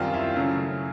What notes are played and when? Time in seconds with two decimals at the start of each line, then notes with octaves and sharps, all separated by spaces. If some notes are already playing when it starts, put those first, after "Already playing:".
Already playing: F#2 D#3 G3 C4 F4
0.14 E4
0.36 C#3 F#3 A3 C#4